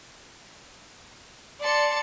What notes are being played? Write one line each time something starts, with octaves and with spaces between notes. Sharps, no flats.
D5 A5 C6 C#7